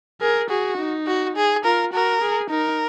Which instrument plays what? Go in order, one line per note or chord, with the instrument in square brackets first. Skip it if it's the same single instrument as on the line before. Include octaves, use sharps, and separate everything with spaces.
[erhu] G#4 [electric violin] A#4
[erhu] F#4 [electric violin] G#4
[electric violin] D#4
[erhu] F#4
G#4
[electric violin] F4 [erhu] A#4
[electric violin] F#4 [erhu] A#4
[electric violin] G#4
[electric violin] D#4 [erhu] A#4